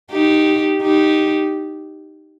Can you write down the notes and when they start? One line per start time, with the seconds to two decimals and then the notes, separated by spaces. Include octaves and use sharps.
0.11 D#4 G4
0.82 D#4 G4